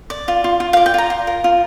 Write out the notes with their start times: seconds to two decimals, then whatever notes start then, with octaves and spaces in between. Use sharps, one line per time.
0.10 D5
0.28 F4
0.44 F4
0.60 F4
0.73 F5
0.77 D5
0.86 G5
0.94 F4 A#5
1.10 F4
1.27 A#4
1.44 F4